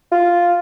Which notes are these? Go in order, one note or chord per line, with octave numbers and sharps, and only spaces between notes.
F4